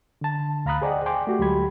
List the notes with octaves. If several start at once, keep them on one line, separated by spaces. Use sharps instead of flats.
D3 A5
D2 F5 A#5 B5 D#6 F#6
G#4 C5 D5 D#5 F#5 G5
G5 G#5 C6 D6
A3 F#4 G4
D2 F#3 G#3 G4 B5 G#6